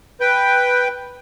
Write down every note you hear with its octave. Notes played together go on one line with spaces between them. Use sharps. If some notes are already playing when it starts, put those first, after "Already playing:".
B4 G5